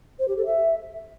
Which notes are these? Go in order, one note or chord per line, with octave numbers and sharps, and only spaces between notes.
C5
G4
A4
E5